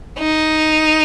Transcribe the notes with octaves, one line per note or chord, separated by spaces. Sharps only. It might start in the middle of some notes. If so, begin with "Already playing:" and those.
D#4